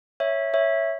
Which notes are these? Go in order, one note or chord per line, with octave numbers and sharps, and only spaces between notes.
C#5 E5
C#5 E5